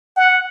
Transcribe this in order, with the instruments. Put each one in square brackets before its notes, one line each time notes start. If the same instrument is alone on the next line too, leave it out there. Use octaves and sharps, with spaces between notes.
[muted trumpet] F#5